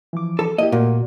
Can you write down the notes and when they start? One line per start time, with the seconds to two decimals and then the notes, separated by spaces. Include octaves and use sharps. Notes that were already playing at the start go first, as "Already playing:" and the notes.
0.13 E3 F3 D6
0.39 A4
0.58 A#3 E4 G4 D#5
0.72 A#2 A3 A#3 F#4